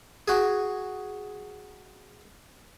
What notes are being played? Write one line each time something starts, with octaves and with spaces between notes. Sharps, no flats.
F#4 G#4